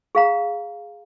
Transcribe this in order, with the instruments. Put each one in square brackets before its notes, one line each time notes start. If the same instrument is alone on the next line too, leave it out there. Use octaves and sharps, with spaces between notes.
[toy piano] G#4 F5 A#5